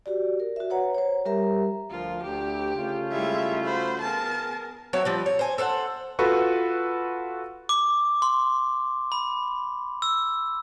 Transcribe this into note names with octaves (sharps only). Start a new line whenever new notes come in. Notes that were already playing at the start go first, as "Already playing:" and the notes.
F#4 G4 D5
A#4
F#4 E5
B4 C#5 F#5 A#5
C5 C#5
G3 G4 A#4 E5 A#5
D2 F3 F4 A#4
D2 G4
C#3 A3 F4
G3 G#3 E4 E5
F#4 C5 B5
B3 G#4 A#4 A5
F#3 C4 C#5 E5
F3 G3 C4
C#5
C5 G#5
A4 C5 F5 F#5
F4 F#4 A4 B4 C#6
D6
C6
B5
E6